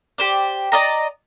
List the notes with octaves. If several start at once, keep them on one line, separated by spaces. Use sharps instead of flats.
G4 C5 D5
D5 D#5 A#5